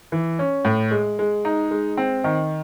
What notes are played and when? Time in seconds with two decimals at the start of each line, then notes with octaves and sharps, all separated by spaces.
0.12 E3
0.39 C#4
0.65 A2
0.91 G#3
1.19 G#3
1.45 D#4
1.71 G#3
1.97 C4
2.24 D#3